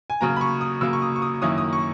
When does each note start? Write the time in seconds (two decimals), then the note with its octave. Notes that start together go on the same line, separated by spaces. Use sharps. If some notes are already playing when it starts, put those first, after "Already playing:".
0.10 G#5
0.21 C#3 F#3 A#3 A#5
0.36 B5
0.41 C#6
0.61 D#6
0.81 C#3 F#3 A#3 E6
0.93 C#6
1.02 D#6
1.16 C#6
1.22 D#6
1.42 F#2 D#3 A#3 C#4 E4 D#6
1.58 D#6
1.73 C#6